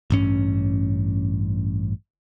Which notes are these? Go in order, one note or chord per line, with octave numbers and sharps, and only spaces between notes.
A1 G2 C#4